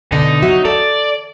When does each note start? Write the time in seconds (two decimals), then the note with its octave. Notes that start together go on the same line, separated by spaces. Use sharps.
0.12 B2 D3 D4 D#4
0.42 F#3 F#4 E5
0.65 A4 D5